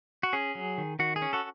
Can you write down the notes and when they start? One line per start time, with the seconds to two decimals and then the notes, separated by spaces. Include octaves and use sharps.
0.23 F#4
0.33 C#4 G#4
0.55 F#3
0.78 D#3
0.99 D#3 F#4
1.16 G#4
1.22 C#4
1.33 F#4 A4